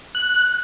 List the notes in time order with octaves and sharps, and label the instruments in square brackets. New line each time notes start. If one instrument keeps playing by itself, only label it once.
[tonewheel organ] F#6